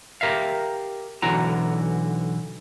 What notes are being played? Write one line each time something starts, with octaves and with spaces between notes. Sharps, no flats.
G4 A#4 E5 F5
B1 D3 E3 F#4 A#5